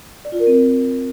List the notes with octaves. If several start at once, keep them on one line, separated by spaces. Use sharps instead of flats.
D5
F4
A#4
C4